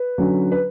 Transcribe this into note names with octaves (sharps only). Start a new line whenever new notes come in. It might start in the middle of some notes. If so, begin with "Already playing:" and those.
Already playing: B4
D3 F#3 C#4
B4